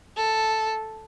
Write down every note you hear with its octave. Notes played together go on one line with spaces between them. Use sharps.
A4